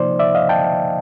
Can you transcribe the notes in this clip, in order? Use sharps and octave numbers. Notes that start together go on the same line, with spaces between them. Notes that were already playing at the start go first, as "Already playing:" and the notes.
Already playing: C3 F3 A#3 D#4 C5 D5
D5 E5
D#5 F5
G5 A5